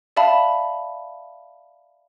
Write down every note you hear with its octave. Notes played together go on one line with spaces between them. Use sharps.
D5 E5 F5 A5 B5